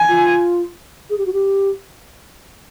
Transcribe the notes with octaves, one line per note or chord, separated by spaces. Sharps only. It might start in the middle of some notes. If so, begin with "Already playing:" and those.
Already playing: G#5
F4
G#4
G4
F#4
G4